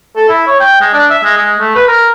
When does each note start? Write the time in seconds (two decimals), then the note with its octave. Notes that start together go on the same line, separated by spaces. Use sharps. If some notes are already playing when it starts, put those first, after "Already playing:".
0.16 A4
0.29 E4
0.47 C#5
0.60 G5
0.81 G#3
0.93 D4
1.10 E5
1.24 G#3
1.37 G#3
1.59 A3
1.76 B4
1.88 A#4